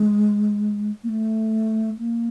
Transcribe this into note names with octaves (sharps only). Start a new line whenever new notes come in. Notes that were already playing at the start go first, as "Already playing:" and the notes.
Already playing: G#3
A#3
A3
A#3